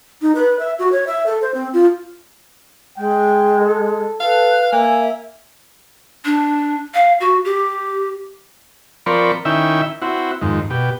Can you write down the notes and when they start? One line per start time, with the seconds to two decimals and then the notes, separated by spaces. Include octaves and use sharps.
0.22 D#4
0.35 B4
0.59 E5
0.79 F#4
0.92 C#5
1.07 E5
1.26 A4
1.42 C5
1.54 C4
1.73 F4
2.97 G#3 G5
3.61 A4
4.20 A4 B4 F5
4.72 A#3 E5 G#5
6.25 D4
6.94 F5
7.20 F#4
7.45 G4
9.06 F3 C4 A#4 D5 B5 C#6
9.45 D#3 C#4 E4 E5 G5
10.02 C4 E4 F#4
10.42 F2 G#2 D#3
10.70 B2 G4